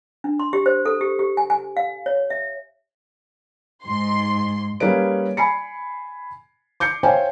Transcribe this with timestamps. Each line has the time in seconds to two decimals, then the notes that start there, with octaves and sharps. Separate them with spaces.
0.24 D4
0.40 C6
0.53 G4
0.66 C5
0.86 A4
1.01 G4
1.19 G4
1.37 G#5
1.50 G#5
1.77 F5
2.06 C#5
2.30 E5
3.83 G#2 C6
4.80 G3 A#3 C#4 G#4 B4 D7
5.37 G#5 B5 C7 C#7
6.80 D6 G6 C7 C#7
7.03 C5 C#5 E5 F5 G5 G#5